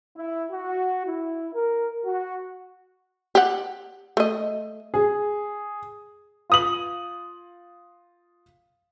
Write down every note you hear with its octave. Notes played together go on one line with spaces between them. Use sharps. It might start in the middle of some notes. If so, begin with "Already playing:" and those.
E4
F#4
E4
A#4
F#4
G4 F#5
A3 D#5
G#4
F4 D#6 F#7